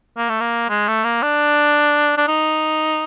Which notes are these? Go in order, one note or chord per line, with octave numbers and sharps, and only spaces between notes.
A#3
A3
A#3
G#3
A3
A#3
D4
D4
D#4